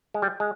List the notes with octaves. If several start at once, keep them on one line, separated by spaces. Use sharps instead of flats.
G#3
G3
G#3